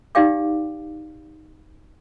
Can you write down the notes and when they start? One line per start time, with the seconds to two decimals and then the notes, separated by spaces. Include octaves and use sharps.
0.15 D#4 G4 D5 F5 G5 D6